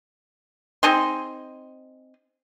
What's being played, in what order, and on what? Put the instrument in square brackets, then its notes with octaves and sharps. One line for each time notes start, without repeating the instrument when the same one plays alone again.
[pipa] C4 D#4 G#4 C6